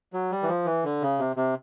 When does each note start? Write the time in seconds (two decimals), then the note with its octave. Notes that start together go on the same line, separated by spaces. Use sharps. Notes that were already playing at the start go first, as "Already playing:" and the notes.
0.13 F#3
0.32 G3
0.43 E3
0.48 F3
0.66 E3
0.84 D3
1.02 C#3
1.19 C3
1.36 C3